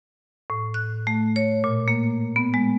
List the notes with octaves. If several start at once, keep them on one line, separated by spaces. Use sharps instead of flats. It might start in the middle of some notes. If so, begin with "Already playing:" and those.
A2
F#6
A3
C#5
A#2
A#3
B3
G#3